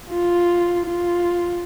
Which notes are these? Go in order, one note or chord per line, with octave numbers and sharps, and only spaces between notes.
F4
F4